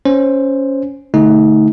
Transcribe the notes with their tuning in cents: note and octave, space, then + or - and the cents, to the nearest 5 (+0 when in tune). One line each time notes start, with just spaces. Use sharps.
C#4 +0 C5 +0
D3 +0 A3 +0 D#4 +25